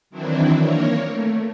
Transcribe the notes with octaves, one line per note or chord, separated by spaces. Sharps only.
D#3 E3 F#3 C4 D4 E4
A#3 A#4 C#5
A3